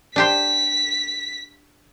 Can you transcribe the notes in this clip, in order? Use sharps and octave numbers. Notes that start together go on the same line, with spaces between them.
D4 G4 C5 B6